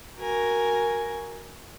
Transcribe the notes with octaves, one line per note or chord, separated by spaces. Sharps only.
F#4 A#4 G#5